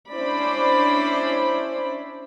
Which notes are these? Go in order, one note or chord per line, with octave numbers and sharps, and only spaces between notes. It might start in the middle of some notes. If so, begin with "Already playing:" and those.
C#4 D4 E4 C5 D5 B5